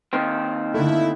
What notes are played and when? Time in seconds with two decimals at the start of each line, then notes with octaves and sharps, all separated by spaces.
0.13 D#2 D#3 C4
0.74 D3 A3 E4